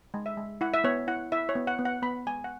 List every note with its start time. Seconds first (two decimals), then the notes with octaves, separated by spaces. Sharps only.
0.14 G#3
0.26 E5
0.37 G#3
0.61 E4 F#5
0.74 E5
0.84 B3 C#5
1.08 E4 F#5
1.32 E4 E5
1.49 C#5
1.55 B3
1.67 F#5
1.79 B3
1.85 F#5
2.02 B3 B5
2.26 G#3 G#5
2.44 F#5